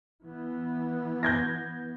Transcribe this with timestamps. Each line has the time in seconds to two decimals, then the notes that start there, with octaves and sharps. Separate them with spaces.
0.23 E3 B3
1.23 G6 G#6 A#6